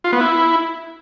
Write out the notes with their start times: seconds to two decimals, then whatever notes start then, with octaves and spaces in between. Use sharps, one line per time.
0.04 F4
0.12 B3
0.21 E4